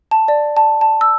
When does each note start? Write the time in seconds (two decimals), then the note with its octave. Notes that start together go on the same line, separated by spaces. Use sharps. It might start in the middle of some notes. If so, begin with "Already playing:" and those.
0.11 A5
0.28 D5
0.57 A5
0.81 A5
1.01 E6